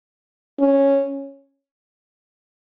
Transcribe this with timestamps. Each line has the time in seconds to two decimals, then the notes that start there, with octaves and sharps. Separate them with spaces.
0.60 C#4